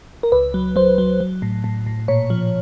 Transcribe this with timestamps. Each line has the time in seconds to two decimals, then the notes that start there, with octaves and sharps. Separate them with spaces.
0.23 A#4
0.32 C#2 B4
0.54 F#3
0.76 F#3 C5
0.98 F#3
1.20 F#3
1.42 A2
1.64 A2
1.86 A2
2.08 A#2 C#5
2.30 F3